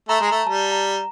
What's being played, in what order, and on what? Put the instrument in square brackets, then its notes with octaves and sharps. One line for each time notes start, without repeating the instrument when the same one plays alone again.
[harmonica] A3 [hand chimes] A#5
[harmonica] G#3
[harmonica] A3 [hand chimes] A#5
[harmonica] G3 [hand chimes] A5
[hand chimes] A#5